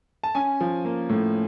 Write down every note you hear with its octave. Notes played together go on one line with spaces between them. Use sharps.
A5
C#4 G#5
F3
A#3
A2